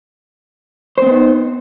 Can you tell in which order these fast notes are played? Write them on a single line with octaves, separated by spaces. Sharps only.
C5 C4 B3 D#4